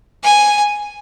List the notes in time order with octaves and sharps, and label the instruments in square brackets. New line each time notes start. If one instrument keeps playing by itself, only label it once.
[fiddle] G#5